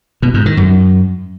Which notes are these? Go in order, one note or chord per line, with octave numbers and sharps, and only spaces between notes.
B2
G#2
D#3
F#2